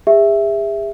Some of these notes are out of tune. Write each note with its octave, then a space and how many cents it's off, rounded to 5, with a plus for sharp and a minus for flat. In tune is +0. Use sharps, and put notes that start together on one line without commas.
G#4 -45 E5 +0